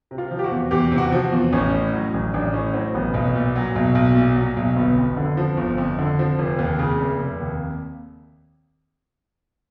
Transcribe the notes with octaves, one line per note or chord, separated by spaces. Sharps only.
C3
F4
F3
G4
F#4
E2
E2 G4
C3
F#4
F3
E2
A1 C#4
A2
F#3
A1
A1 D4
A2 C#4
F#3 C4
A1 B3
B1
A#2
F#3
B1
B1
A#2
F#3
B1
G1 B3
F2
D3
F3
G1
F2
D3
F3
F1
D#2
C#3
F1
F1
D#2